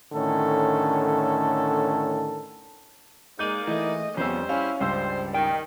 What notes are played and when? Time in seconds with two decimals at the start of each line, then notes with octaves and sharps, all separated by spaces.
0.13 A2 D3 D#3 C#4 A4
3.39 G#3 A#3 D#4 D5 G6 D#7
3.67 A2 E3 A3 D#5
4.17 F2 C#3 G3 B3 C#4 C5 E6
4.49 C#4 E4 F5 G#5
4.81 C#2 G2 G3 C5 E6
5.34 D#3 G5